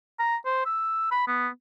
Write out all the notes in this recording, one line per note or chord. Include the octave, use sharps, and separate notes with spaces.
A#5
C5
E6
B5
B3